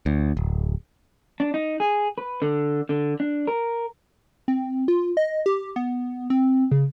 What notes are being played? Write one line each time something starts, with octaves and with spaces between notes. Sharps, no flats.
D2
D1
D4
D#4
G#4
B4
D3
D3
D4
A#4
C4
F4
D#5
G4
B3
C4
C#3